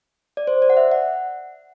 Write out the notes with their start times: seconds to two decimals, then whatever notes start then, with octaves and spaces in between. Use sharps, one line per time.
0.37 D5
0.47 C5
0.62 D5
0.70 F#5
0.77 E5
0.92 F#5